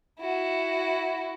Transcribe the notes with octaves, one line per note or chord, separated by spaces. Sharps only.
E4 F#4